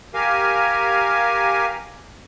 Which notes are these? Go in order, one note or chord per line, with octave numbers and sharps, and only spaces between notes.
G4 A#4 F5 G#5